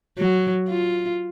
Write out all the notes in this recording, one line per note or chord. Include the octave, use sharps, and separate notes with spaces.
F#3
F4